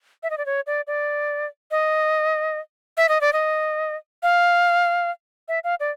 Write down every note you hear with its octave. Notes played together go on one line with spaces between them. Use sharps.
E5
D#5
D5
C#5
D5
D5
D#5
E5
D#5
D5
D#5
F5
E5
F5
D5